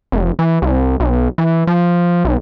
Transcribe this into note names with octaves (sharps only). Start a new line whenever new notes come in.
F1
E3
C2
B1
E3
F3
B1